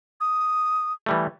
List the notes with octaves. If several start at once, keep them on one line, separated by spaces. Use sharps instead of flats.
D#6
E3 G3 A3